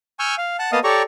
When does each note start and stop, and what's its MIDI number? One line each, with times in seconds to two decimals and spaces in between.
0.19 0.35 80
0.19 0.35 85
0.19 0.35 88
0.19 0.35 89
0.19 0.35 91
0.38 0.57 77
0.59 0.72 78
0.59 0.72 81
0.59 0.72 90
0.72 0.79 58
0.72 0.79 59
0.72 0.79 75
0.72 0.79 77
0.72 0.79 81
0.72 0.79 87
0.84 1.02 67
0.84 1.02 69
0.84 1.02 73
0.84 1.02 74
0.84 1.02 82
0.84 1.02 85